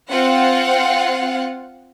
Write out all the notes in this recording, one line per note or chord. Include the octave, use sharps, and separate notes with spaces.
C4 F4 F5 F#5